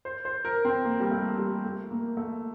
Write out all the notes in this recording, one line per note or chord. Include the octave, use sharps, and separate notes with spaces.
C5
C5
A#4
C4
A#3
G3
A3
G3
A3
A#3
A3